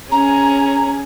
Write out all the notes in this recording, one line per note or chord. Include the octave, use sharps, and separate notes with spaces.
C#4 G#4 A#5